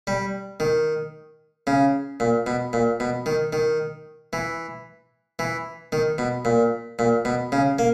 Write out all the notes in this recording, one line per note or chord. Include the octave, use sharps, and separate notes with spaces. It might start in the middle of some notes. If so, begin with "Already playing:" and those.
G3
D#3
C#3
A#2
B2
A#2
B2
D#3
D#3
E3
E3
D#3
B2
A#2
A#2
B2
C#3
A#3